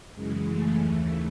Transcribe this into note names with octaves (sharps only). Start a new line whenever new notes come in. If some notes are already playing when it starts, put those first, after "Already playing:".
F#2 C#3 E3 G#3
A3
D#2 C#3 E3